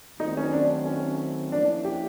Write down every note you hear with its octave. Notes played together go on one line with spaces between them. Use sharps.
D#3 F#3 A3 C4 D#4
C#4
D4
C#4
F3 A#3 C#4 D4 E4
G4